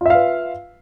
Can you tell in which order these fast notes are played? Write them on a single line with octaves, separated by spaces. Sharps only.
F4 E5 F5 B4